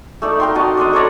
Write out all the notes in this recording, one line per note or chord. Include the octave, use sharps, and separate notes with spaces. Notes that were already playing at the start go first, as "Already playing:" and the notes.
A3 D#4 D5
A#4 G5 C6
F#4 D#5 A5
D4 A#4 C5 D#5
A4 C#5 D5 A#5